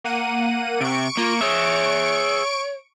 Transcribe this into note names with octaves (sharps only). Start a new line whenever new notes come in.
A#3 F#5 D#7
C3 C#6 D7
A#3 F4
G#4 C#5 E5